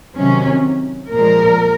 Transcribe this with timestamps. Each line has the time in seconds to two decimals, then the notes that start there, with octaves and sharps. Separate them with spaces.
0.17 C3 D#3 F#3 C#4
1.11 A#2 F3 G#3 A#4